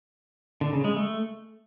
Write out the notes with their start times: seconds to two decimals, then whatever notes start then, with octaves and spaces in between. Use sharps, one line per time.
0.61 D3
0.73 C#3
0.84 G#3
0.96 A3